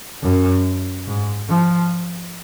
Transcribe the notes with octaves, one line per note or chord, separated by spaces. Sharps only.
F#2
G#2
F3